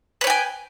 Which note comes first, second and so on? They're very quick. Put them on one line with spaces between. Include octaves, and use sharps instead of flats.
B4 C#5 G5 G#5